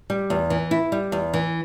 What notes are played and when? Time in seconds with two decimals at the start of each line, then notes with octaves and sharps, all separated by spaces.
0.10 G3
0.30 E2
0.50 E3
0.71 E4
0.92 G3
1.12 E2
1.34 E3